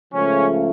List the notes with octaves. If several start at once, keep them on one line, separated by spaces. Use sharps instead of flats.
C#2 C#3 F3 A3 C#4